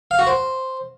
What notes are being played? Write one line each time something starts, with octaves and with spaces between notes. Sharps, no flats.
F5
F#4
C5